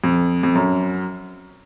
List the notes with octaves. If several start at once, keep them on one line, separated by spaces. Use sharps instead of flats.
F2
F2
F#2